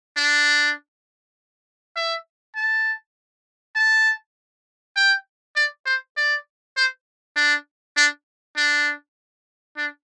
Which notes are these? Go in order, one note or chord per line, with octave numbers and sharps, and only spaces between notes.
D4
E5
A5
A5
G5
D5
C5
D5
C5
D4
D4
D4
D4